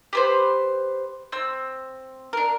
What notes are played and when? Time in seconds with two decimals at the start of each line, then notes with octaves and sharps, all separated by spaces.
0.13 G4 B4 C5
1.32 C4 E6
2.33 D4 A#4